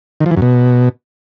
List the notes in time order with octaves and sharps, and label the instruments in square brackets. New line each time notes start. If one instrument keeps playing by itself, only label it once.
[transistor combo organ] D#3
F3
E3
F#2
B2